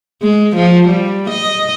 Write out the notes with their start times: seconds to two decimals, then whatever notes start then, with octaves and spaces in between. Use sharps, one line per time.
0.23 G#3
0.57 F3
0.88 G3
1.30 D#5